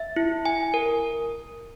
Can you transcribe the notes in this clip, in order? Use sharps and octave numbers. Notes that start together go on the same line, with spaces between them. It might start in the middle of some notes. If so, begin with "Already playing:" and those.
Already playing: E5
E4
G#5
A#4